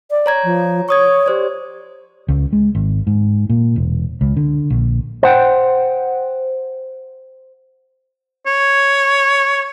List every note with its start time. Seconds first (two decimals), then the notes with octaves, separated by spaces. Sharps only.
0.11 D5
0.26 C#5 A#5 G#6
0.44 F3
0.89 C#5 C#6 D#6 G#6
1.26 G4 C5 D5
2.28 C#2
2.53 G#3
2.75 G#1
3.07 G#2
3.49 A#2
3.76 E1
4.21 C#2
4.36 D3
4.70 A#1
5.23 C5 F#5 G5
8.46 C#5